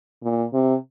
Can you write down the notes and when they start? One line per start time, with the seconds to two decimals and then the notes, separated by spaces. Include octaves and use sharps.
0.23 A#2
0.54 C3